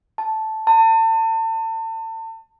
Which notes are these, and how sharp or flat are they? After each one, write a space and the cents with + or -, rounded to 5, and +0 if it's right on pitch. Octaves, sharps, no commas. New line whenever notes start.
A5 -5
A5 +35